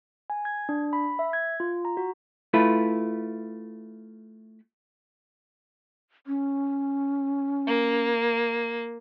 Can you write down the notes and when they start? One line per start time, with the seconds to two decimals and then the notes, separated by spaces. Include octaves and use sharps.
0.30 G#5
0.45 G#6
0.69 D4
0.93 B5
1.19 E5
1.33 G#6
1.60 F4
1.85 A#5
1.97 F#4
2.53 A3 E4 F4 B4
6.27 C#4
7.67 A#3